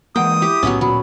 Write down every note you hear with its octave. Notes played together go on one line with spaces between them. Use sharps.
E3 G#3 A#3 F#5 G5 D#6
E4 G4
B1 A2 F#3 B3 C#4
D1 A#2 F#3 B5